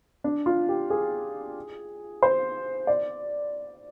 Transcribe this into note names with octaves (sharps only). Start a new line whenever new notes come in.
D4
F4
G4
G#4
C5
D5